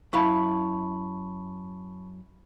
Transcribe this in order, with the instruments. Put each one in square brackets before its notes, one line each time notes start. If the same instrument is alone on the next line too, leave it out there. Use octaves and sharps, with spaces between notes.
[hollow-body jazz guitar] F#2 E4 F5 [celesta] A5 B5 C#6